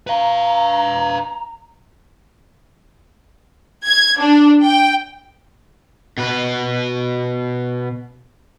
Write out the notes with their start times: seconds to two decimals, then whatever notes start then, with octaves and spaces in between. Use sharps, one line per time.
0.07 B4 F5 A#5
3.85 G#6
4.19 D4
4.63 G5
6.18 B2 B4